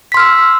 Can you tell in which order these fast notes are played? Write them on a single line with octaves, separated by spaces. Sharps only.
B6 C6 F6 E6